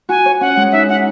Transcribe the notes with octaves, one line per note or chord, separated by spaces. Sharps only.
F#4 G#5
C#5
C#4 F#5
G#3
D#4 E5
D#4 F#5